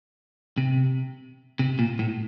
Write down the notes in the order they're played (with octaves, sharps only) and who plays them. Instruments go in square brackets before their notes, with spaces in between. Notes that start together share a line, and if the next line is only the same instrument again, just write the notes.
[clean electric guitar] C3
C3
A#2
A2